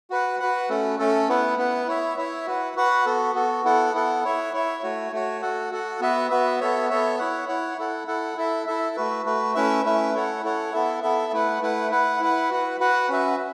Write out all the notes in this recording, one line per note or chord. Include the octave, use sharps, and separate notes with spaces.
F#4 B4 F#5
F#4 B4 F#5
A3 C#4 A4
A3 C#4 A4
B3 E4 B4 F#5
B3 E4 B4 F#5
E4 C#5 E5
E4 C#5 E5
F#4 B4 F#5
F#4 B4 F#5
B3 F#4 A4
B3 F#4 A4
B3 E4 A4 F#5
B3 E4 A4 F#5
E4 C#5 E5
E4 C#5 E5
A3 F#4 C#5
A3 F#4 C#5
F#4 A4 F#5
F#4 A4 F#5
B3 F#4 B4 E5
B3 F#4 B4 E5
B3 A4 C#5 E5
B3 A4 C#5 E5
E4 C#5 F#5
E4 C#5 F#5
E4 A4 F#5
E4 A4 F#5
E4 A4 E5
E4 A4 E5
A3 F#4 B4
A3 F#4 B4
A3 C#4 E4 B4 E5
A3 C#4 E4 B4 E5
E4 A4 C#5 F#5
E4 A4 C#5 F#5
B3 E4 A4 E5
B3 E4 A4 E5
A3 E4 B4 F#5
A3 E4 B4 F#5
E4 B4 F#5
E4 B4 F#5
F#4 B4 F#5
F#4 B4 F#5
C#4 F#4 B4 E5